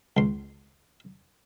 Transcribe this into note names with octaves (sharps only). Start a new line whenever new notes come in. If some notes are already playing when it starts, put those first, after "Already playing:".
C#2 C6